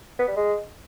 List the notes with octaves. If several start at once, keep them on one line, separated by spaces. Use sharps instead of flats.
B3
G3
G#3